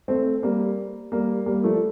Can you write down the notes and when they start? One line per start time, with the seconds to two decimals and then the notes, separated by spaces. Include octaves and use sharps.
0.08 A3 C4
0.43 G3 A#3
1.12 G3 A#3
1.46 G3 A#3
1.64 F3 A3